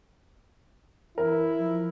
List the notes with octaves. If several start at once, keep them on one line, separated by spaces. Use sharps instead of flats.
E3 E4 A#4
F3